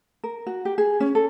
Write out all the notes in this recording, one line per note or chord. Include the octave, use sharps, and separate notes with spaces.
A#4
F#4
G4
G#4
C#4
A4